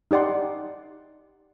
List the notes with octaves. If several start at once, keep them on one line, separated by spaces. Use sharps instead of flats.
D#4 G4 D5 F#5 C6